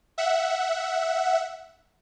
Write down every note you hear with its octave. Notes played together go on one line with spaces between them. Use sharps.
E5 F#5